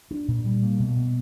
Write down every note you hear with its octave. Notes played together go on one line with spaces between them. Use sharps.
D4
A#2
G3
A#3
B2
B2